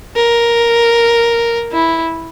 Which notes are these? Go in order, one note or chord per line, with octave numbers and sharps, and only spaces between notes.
A#4
E4